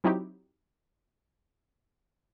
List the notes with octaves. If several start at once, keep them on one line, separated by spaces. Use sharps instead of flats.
F#3 C4 D#4 E4 F#4 G4